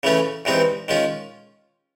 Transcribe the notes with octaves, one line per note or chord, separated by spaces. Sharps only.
C#3 E3 A3 C#4
G2 E3 G#3 C4 D#4
D#3 G#3 C#4 F4